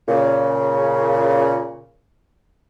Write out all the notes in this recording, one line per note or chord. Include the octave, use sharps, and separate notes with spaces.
A#2 C#3